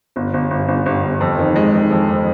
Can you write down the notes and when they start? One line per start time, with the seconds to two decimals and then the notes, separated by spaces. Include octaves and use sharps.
0.16 G1
0.34 G1
0.51 G1
0.68 G1
0.86 G1
1.03 G1
1.21 F2
1.39 D#3
1.56 G#3
1.74 D#3
1.91 F2
2.08 F2